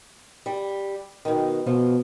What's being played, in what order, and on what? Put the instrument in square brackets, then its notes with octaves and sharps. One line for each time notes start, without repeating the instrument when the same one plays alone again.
[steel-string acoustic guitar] G3
B2 D#3
[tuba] B2 [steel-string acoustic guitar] F3